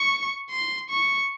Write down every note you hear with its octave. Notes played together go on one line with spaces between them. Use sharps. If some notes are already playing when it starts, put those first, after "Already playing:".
Already playing: C#6
C6
C#6